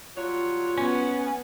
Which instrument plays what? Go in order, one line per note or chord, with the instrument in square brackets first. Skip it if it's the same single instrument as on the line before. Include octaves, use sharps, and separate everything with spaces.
[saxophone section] F#3 G3 C#5 [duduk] F4
[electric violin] B3 [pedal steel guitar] C#4